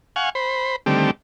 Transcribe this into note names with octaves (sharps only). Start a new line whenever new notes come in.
F5 F#5 G#5 C#6
C5 B5
D3 D#3 G3 A3 C4 G4